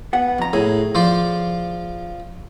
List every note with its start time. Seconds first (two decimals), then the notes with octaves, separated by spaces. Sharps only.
0.13 B3 F#5
0.38 F2 A#5
0.53 A2 G#4
0.95 F3 C5 D5